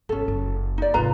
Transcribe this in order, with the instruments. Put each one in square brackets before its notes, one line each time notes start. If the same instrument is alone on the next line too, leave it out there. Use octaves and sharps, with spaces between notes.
[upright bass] G1 [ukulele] C#4 A4
[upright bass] F#1
[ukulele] D#4 D5
[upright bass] G#2 C3 [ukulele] F4 B4 A#5